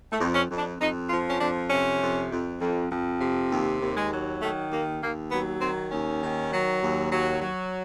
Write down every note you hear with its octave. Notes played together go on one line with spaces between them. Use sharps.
A3
F2
C#4
F2
D4
F2 D#4
F3 F4
C#4
F2 D4
C3 C#4
F2
F2
F2
F2
C3
D#2
D#2
G#3
F#3
D#3 A3
D#2 A#3
D#2 A#3
F#3 B3
D#3 C4
D#2 C#4
D#3
F#3
D#2
F#3
F#3